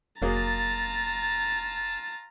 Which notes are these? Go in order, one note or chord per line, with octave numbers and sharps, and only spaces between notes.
F1 F#3 A#3 F4 G#4 A5 A#5 A6